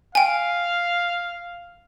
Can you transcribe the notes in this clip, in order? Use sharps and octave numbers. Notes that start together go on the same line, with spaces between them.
F5 G5 G#5